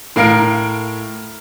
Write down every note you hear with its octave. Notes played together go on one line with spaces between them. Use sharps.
A2 A#4 F5 F6 D7